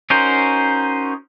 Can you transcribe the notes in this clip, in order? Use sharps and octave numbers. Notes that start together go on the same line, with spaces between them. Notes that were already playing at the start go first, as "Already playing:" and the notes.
C#4 D#4 F#4 A#4 C5